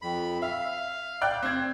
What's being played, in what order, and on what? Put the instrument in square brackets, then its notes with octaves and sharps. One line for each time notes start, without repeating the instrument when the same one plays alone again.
[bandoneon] F2 B5
[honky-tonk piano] E5 [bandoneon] F5
[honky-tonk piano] D5 G5 F#6
C4 G#6